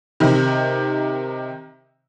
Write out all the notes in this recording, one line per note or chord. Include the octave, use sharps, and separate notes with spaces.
C3 D#3